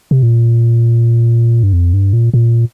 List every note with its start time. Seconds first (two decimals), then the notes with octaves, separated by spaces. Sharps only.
0.11 C3
0.23 A#2
1.63 G2
1.73 F2
1.93 G2
2.13 A#2
2.34 A#2